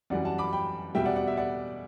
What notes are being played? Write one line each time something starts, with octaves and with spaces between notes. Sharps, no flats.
F#2 E3 G3 D5 F#5
F#5 A5
B5 D6
G5 B5
E2 B2 G3 E5 G5
D5 F#5
D5 F#5
E5
D5 F#5